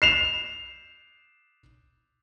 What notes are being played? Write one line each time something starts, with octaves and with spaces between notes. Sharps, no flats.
C7 E7 F7